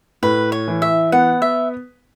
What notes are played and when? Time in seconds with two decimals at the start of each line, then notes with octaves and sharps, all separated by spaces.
0.23 A2 B4
0.52 C#5
0.68 E3
0.82 E5
1.12 B3 F#5
1.42 E5